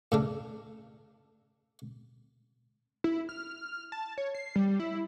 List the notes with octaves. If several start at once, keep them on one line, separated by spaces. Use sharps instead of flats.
A2 C#3 D4
E4
F6
A5
C#5
C7
G3
E4